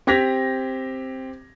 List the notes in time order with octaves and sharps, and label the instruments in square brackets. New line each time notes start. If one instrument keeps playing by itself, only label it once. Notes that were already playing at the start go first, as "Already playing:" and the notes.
[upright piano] C4 G4 G#6 A#6 B6 F7